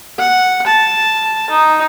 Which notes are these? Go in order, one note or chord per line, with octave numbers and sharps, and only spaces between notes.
F#5
A5
D#4